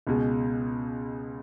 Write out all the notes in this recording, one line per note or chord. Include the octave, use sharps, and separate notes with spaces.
C#2 B2 G#3